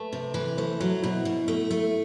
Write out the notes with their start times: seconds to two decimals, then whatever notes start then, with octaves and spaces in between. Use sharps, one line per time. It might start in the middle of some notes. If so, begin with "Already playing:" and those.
Already playing: A3 B4
0.13 C3
0.34 E3
0.58 A3 C5
0.81 F#3
1.03 B2 E4
1.25 B2
1.48 A3
1.71 A3